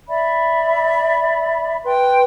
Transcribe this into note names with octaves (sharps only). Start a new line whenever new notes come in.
D5 E5 B5
B4 G5 C6